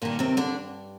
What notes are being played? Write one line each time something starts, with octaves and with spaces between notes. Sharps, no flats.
G2 A#2 D#3 A#3
C3 C4
D3 D4